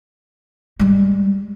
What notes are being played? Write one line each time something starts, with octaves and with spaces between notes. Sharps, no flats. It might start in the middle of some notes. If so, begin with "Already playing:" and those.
G3 G#3